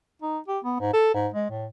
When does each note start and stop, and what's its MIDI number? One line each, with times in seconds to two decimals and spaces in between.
0.22 0.39 63
0.48 0.59 67
0.65 0.78 59
0.80 0.88 44
0.93 1.12 69
1.14 1.28 44
1.34 1.48 56
1.50 1.66 45